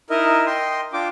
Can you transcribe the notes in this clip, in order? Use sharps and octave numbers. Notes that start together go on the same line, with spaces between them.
D#4 E4 A#4 D#5
D#5 G5 C6
D4 F4 G5 D6